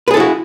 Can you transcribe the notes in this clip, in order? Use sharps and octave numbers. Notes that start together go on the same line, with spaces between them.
E4 F#4 G#4 A4 B4